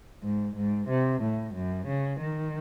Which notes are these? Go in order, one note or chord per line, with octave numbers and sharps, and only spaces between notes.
G#2
G#2
C3
A2
F#2
C#3
D#3